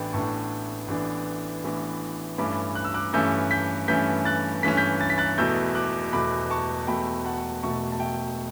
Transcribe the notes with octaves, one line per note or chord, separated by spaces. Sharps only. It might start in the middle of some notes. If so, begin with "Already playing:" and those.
Already playing: A1 A2 E3 B3 D4 G5 B5
A1 A2 E3 B3 D4 A5 C#6
A1 A2 E3 B3 D4
A1 A2 E3 B3 D4
G2 E3 A3 C#4 B5 D6
F#6
E6
D6 F#6
G2 E3 A3 C#4 E6 G6
G6 B6
G2 E3 A3 C#4 G6 B6
F#6 A6
G2 E3 A3 C#4 B6
G6 B6
A6
B6
F#6 A6
E1 E2 B2 A3 E6 G6
D6 F#6
E1 E2 B2 A3 B5 D6
A5 C#6
E1 E2 B2 A3 G5 B5
F#5 A5
E1 E2 B2 A3 A5 C#6
A5
E5 G5